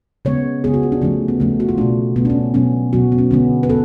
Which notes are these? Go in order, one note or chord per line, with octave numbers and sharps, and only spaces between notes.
C#3 G#3 B3 C#5
C#3 G#3 B3 G#4
F#4
F4
D4
C#3 F3 A3 C#4
B3
C#3 F3 A3 C#4
F#4
F4
B2 A3 D4
B2 A3 B3
D4
C#4
B2 F#3 B3 C#4
B2 F#3 B3 F#4
B3
C#4
D3 G#3 B3 C#4
B4
B3 A4